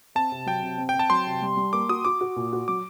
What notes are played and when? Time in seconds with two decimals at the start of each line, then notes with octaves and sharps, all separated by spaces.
0.15 C4 A5
0.32 C3
0.46 F#3 G5
0.63 C3
0.78 C4
0.89 G5
0.94 C4
0.99 A5
1.10 F#3 C6
1.27 C3
1.42 G3
1.57 G3
1.73 A#3 D6
1.89 F#4 D#6
2.05 F#4 D6
2.21 F#4
2.36 A#2
2.53 F#4
2.68 F#3 D6